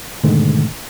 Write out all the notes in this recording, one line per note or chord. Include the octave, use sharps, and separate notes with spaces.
G#2 B2 D3 D#3 G#3 A3